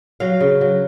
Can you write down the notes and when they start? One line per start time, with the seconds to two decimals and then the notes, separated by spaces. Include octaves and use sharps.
0.20 F#3 F5
0.40 C#3
0.61 F#3